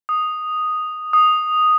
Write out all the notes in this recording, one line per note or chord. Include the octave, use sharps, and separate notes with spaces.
D#6
D#6